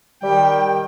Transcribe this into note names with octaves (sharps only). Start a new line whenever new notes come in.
D#3 G3 D5 G5